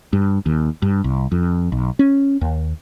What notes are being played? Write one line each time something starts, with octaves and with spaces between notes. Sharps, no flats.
G2
D#2
G2
C2
F2
B1
C#4
D#2